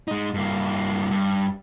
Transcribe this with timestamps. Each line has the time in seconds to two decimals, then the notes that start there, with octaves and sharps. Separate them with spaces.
0.08 G#3 D#4
0.34 G2 A#3
1.11 G2